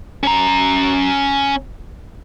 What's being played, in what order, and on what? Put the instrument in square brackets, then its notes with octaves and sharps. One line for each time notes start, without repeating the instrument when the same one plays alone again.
[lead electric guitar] C#4 A#5